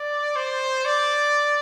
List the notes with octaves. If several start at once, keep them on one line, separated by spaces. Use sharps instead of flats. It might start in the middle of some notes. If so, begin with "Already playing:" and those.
Already playing: D5
C5
D5